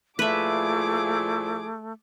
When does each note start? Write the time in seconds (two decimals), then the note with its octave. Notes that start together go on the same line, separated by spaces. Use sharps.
0.19 A#2 F3 A3 E4 G#4 B4 E5 D6